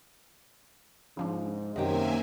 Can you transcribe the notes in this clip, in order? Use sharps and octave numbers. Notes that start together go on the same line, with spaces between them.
G#2 C#3 F3 D4
F#2 C3 D#3 A#3 G4 D#5 E5 G#5